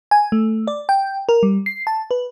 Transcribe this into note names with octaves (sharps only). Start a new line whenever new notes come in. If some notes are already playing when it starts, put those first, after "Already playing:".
G#5
A3
D5
G5
A#4
G3
C7
A5
B4